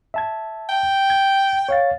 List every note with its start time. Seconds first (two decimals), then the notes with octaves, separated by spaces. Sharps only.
0.14 E5 A5 G#6
0.69 G5
1.10 G#6
1.69 C#5 F5 A6